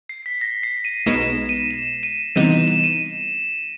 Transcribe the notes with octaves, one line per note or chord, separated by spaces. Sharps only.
C7
B6
A#6
C7
D#7
B1 B2 G#3 B3 D#4 E7
D#7
E7
D#7
C3 E3 G3 B3 D#4 D#7
E7
E7
D#7